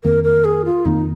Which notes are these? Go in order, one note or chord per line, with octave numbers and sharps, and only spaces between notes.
F2 D#3 A#3 A#4
A#4
G#4
F4
F2 D#3 A#3 D#4